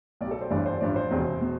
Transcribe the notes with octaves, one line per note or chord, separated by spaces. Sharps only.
B1 B2 G4 D5
A4
C5
G1 G2 E3 D5
C5
A1 G2 F3 D5
C5
E1 E2 C3
B2